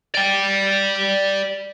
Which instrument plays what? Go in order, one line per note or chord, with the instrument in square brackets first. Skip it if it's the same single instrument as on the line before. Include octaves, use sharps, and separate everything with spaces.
[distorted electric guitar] D5 G5